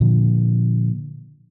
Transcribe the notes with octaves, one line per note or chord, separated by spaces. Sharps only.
A#2 D3 F3